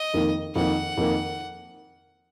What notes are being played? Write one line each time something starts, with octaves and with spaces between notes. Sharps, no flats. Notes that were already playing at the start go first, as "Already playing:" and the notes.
Already playing: D#5
F2 D#3 A#3
F2 D#3 A#3 F#5
F2 D#3 A#3